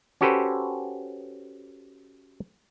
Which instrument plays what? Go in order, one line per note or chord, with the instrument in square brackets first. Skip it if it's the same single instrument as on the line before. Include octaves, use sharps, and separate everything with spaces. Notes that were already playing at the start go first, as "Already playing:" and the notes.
[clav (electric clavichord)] C#4 F#4 G4 A4 B4 C5